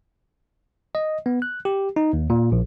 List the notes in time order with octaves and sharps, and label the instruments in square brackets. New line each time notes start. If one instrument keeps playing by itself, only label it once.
[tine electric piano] D#5
B3
F#6
G4
D#4
D#2
A#2
A#1